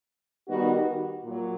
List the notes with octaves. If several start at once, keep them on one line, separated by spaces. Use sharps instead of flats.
D#3 G3 B3 D#4 F#4
A#2 F#3